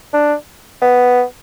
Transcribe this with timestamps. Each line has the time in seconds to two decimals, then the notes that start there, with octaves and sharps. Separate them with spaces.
0.13 D4
0.82 B3